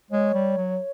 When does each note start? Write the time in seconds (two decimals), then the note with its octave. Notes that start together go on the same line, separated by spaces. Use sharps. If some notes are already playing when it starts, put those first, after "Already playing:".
0.11 G#3 C#5
0.34 G3
0.57 F#3